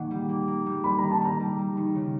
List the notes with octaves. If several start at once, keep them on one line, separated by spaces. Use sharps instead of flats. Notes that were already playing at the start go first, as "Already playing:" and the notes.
Already playing: A#2 D#3 A#3 F#5
G3
A#3
A#3
G3
G3 B5
D#3 A#5
A5
G3 A#5
G3
G3
D#3
C#3